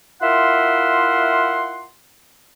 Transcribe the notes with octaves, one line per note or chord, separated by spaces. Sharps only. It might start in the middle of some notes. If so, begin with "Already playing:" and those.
E4 F4 A#4 E5 F#5 C6